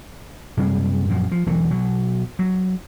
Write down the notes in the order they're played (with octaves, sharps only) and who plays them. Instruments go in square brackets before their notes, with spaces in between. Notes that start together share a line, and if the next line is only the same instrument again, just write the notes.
[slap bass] F#2 C3 G3 G#3
F#2 A#2 F3
F3
E1 E2 E3 F#3
B2 F#3
F#3